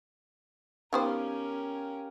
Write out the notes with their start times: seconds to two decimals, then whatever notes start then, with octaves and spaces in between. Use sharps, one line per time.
0.93 D#3 B3 C#4 G4 A#4 C5 F5